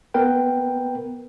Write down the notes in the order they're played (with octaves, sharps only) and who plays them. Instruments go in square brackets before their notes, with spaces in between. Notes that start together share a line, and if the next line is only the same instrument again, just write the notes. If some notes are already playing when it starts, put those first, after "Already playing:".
[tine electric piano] B3 A#4 B4 G5